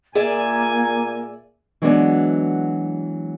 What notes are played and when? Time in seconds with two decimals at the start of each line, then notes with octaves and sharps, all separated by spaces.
0.15 A#2 A#3 G#4 D5 E5 G#5
1.82 E3 F#3 G#3 B3 D4 F#4